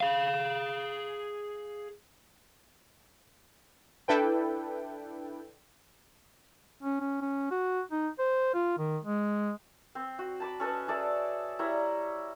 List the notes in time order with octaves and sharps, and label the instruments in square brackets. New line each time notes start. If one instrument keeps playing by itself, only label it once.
[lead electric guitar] G#4 F5
[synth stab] D4 E4 A4 B4 G5
[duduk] C#4
C#4
C#4
F#4
D#4
C5
F4
D#3
G#3
[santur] C4
F#4
A5 B5 D6
C#4 A4 B4 D#5
G#4 A4 D5 E5
G3 E4 C#5 A#5